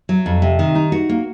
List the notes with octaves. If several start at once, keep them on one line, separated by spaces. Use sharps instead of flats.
F#3
F2
C3
D#3
D#4
F#4
A#3